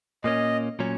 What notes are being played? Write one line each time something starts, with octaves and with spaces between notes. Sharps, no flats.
A#2 A#3 C#4 D#5
A#2 F#3 C#4